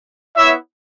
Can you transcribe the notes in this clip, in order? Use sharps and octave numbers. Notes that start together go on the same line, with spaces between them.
B3 E4 C#5 E5